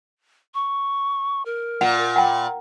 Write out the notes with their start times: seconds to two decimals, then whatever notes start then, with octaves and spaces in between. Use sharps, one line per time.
0.54 C#6
1.46 A#4
1.81 A#2 F#5
2.16 F#5 G5 B5